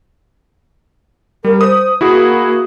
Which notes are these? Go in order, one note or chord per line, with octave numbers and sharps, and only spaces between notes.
G3 A#4
C5 D#6
A#3 E4 F#4 G#4